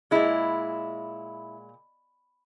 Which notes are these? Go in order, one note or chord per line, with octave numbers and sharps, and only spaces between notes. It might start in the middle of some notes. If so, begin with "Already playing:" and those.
A#2 G#3 E4